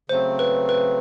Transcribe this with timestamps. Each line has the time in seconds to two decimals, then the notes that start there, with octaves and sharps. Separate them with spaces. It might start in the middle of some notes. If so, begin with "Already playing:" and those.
0.09 C#3 F#3 A3 C4 C5
0.39 B4
0.69 B4